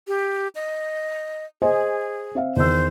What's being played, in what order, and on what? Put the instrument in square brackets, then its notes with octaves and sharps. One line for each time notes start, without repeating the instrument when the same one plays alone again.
[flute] G4
D#5
[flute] G#4 [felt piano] C5 D#5 G#5
[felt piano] C4 E5 F5
[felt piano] E2 D#3 E6 [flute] C5